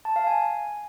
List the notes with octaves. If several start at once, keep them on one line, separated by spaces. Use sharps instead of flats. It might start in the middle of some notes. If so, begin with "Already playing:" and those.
A5
F5
G#5